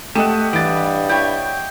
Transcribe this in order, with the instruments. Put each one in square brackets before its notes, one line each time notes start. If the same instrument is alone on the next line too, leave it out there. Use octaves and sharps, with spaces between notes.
[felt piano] A3 D#7 E7 [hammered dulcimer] G4 D#5 F#5 [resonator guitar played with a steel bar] A5
[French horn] G2 [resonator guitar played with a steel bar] E3 [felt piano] A6 D7
[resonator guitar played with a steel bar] E4 C#5 [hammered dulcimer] G5